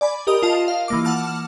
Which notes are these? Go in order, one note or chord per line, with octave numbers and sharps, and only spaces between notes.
D5 G#5 B5
G4 A#4 D#5 D#6
F4 D#5 A5
F5
E3 A#3 D6
F#5 A5 F6